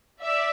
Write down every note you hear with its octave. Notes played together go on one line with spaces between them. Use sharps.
D5 E5